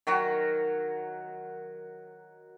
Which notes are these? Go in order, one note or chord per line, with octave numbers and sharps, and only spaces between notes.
D#3 F#3 F#4